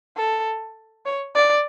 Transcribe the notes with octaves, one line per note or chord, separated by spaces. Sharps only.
A4
C#5
D5